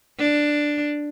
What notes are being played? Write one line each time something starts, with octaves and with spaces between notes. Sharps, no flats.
D4